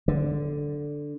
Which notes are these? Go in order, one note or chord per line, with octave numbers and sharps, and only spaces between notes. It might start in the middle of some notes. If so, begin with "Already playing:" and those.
D3